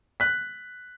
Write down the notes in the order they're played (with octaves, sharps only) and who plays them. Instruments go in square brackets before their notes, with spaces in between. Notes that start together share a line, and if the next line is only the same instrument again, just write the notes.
[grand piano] F#6 B6